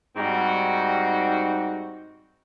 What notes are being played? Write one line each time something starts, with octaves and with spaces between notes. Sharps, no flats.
G#2 G3 C4 D#4 F#4